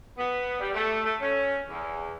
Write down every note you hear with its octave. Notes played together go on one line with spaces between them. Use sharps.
B3
G3
A3
A3
C#4
E2